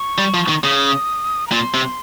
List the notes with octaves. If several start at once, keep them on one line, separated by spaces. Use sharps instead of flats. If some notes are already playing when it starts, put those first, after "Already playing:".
Already playing: C#6
G3
F3
D#3
C#3 D#6
A#5
A#2 C6
C3